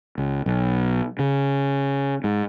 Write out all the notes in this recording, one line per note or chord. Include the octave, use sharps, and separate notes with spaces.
C#2
B1
C#3
G#2